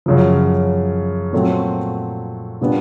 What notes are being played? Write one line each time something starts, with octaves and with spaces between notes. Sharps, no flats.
F#2 C#3 F3
A#2 F#3 A3 C4
A#2 G3 B3 D4